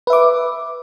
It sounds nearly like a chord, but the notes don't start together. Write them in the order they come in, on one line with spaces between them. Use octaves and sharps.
B4 E5 D6